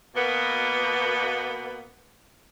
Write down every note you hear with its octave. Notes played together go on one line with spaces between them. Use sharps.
B2 A#3 B3